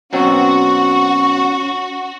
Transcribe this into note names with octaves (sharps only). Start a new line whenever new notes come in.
B2 F#3 C4 C#4 F#4